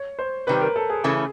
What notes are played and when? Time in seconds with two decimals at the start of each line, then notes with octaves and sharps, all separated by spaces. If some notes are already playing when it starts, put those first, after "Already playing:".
Already playing: C#5
0.19 C5
0.47 C3 D#3 G3 B4
0.61 A#4
0.76 A4
0.90 G#4
1.04 C#3 E3 A3 C#4 G#4